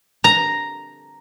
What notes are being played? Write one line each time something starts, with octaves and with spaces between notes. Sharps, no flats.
A#5